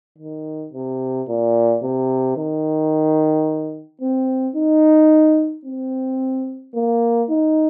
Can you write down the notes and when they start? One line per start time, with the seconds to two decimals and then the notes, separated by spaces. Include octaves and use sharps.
0.18 D#3
0.73 C3
1.28 A#2
1.83 C3
2.37 D#3
4.01 C4
4.56 D#4
5.65 C4
6.75 A#3
7.29 D#4